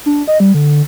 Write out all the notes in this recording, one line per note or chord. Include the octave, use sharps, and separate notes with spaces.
D4
D#5
G3
D3